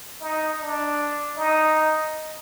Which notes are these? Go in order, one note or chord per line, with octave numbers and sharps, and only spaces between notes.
D#4
D4
D#4